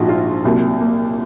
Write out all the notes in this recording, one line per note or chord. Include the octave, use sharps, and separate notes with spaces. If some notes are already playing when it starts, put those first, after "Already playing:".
Already playing: A#1 G#2 F3 F#4
F4
C2 A#2 F#3
A#3